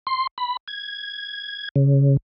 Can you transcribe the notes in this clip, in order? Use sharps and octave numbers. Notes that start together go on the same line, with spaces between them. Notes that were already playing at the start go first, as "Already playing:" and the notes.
C6
B5
G#6
C#3